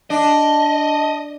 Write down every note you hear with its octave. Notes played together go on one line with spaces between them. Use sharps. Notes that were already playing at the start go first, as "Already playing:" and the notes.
D4 D#5 A5